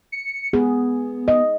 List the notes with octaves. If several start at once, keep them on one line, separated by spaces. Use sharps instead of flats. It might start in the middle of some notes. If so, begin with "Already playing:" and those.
C#7
B3 G#4
D#5